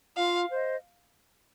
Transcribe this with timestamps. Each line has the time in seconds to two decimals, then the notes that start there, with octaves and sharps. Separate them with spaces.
0.17 F4 F5
0.50 C5 D#5